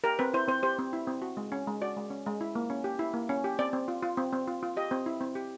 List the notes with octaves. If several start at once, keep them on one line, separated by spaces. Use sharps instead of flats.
G4 A#4
C4 B4
E4 C5
C4 C5
G4 C5
C4
E4
C4
F#4
G#3
C#4
G#3
F#4 D5
G#3
C#4
G#3
E4
A#3
C#4
G4
E4
A#3
C#4
G4
C4 D5
C4
F4
F4
C4
C4
F4
F4
G4 D#5
C4
E4
C4
G4